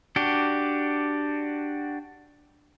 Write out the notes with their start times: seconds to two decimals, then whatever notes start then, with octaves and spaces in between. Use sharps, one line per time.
0.16 D4 F#4 G4